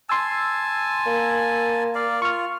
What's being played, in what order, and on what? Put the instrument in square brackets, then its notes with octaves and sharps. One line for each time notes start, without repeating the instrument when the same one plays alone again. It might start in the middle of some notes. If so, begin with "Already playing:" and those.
[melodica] G#5 A5 [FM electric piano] C6 E6
[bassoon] A#3
[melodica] D5 F5
[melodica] F4 [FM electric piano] C#6 F6